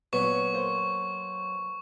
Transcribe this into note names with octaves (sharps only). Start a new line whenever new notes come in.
A#2 F#3 B3 C#6
A#3 C5